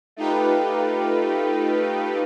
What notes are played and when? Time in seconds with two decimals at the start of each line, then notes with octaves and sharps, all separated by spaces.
0.16 A3 D#4 F4 G4 B4